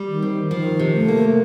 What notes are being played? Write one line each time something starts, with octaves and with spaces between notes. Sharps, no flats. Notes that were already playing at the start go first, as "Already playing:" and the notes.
Already playing: G3
D#3
C4
D#3 F3
C3
A3
A#3